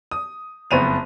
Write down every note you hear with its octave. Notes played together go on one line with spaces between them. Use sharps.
D#6
F#1 F2 B3 D#7 F7